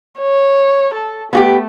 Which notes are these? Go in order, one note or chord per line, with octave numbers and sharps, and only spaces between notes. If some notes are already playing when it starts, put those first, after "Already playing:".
C#5
A4
A3 B3 F#4 G4